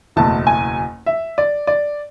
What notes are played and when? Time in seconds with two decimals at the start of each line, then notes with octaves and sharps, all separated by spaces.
0.16 F#1 E2 B2 A3 E4 A5
0.47 G#5
1.06 E5
1.38 D5
1.67 D5